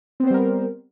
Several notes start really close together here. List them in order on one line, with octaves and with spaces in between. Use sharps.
C4 B3 C5 G3 A#4